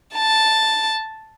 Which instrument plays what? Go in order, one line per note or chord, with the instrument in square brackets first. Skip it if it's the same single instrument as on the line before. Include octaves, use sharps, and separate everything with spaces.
[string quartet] A5